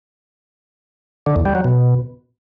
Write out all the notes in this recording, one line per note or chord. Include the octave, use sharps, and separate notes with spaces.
D3
E2
G3
F#3
B2